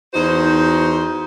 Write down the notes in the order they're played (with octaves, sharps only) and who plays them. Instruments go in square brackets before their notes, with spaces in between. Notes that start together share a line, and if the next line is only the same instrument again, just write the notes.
[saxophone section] E2 D#4 F#4 C5